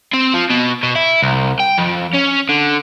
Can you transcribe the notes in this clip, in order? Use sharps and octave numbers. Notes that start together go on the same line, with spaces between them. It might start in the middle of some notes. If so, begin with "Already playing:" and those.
C4
F3
B2
B2
E4
C2
G5
F2
C#4
D3